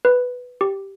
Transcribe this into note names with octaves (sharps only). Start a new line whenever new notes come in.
B4
G4